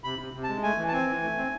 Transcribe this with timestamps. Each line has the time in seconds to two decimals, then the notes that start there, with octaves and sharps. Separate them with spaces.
0.04 C3 B5
0.19 C3
0.34 C3
0.43 A5
0.49 G#3
0.63 A3 G#5
0.78 E3
0.88 A5
0.93 C4 G#5
1.07 E3
1.22 A3
1.37 C4